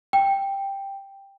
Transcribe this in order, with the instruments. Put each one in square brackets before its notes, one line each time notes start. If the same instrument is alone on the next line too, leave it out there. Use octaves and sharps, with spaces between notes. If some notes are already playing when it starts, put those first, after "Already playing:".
[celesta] G5